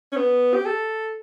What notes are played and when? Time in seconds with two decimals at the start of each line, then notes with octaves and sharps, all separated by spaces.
0.12 C#4
0.17 B3
0.54 G4
0.66 A4